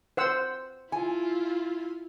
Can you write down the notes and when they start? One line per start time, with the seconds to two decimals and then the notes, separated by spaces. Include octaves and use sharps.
0.17 C5 F#5 E6
0.92 E4 F4 G#5